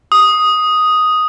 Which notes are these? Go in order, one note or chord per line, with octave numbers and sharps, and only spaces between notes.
D#6